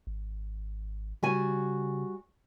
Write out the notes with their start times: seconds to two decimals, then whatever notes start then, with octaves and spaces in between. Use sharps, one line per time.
0.07 G#1
1.23 C#3 G3 F#4 G#5